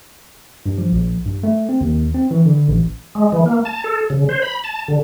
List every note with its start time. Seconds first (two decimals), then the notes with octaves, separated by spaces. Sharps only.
0.66 G2
0.78 F3
0.92 A#1
1.25 G2
1.43 A3
1.69 C4
1.81 D#2
2.14 C4
2.31 E3
2.46 D3
2.68 A1
3.15 G#3
3.32 E3
3.46 A#3
3.65 A5
3.84 A4
4.10 C#3
4.29 C5
4.42 B5
4.64 A5
4.88 D3